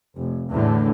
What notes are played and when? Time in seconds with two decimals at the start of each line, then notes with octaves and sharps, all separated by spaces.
0.17 F1
0.50 E2 A2 D3